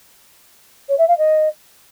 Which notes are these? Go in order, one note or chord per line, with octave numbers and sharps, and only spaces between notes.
C#5
E5
F5
D#5